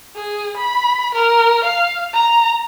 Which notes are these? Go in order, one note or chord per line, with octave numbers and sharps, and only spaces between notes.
G#4
B5
A#4
F5
A#5